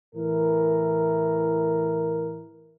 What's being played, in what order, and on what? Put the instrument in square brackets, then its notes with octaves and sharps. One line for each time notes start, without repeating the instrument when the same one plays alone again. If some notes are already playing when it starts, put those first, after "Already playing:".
[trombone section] A2 E3 A#4